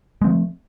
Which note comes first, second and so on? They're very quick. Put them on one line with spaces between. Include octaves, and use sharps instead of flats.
G#3 C4 F3 A3